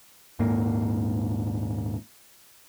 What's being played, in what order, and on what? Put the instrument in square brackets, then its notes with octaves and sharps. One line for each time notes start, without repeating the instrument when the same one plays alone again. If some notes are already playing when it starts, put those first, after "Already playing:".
[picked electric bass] D#1 G#2 A#3